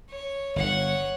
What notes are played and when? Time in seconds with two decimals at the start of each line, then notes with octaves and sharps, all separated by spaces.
0.10 C#5
0.56 G1 C#5 F#5